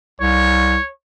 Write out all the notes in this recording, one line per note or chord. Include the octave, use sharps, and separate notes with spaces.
C2 C#5